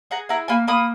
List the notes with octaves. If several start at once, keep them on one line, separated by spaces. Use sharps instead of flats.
G#4 F#5 A#5
E4 F#5 A#5
A#3 G#5 B5
A#3 B5 D#6